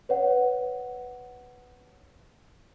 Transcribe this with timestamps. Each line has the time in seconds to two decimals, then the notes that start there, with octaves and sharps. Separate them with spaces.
0.09 B4 C#5 F#5